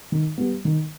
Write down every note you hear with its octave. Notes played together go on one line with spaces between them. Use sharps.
D#3
G3 B3
D#3